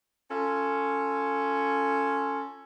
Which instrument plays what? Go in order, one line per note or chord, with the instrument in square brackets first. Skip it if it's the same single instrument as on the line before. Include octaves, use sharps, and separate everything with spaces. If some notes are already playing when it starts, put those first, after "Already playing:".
[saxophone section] C#4 F4 A4